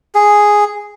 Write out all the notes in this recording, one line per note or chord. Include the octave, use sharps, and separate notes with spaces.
G#4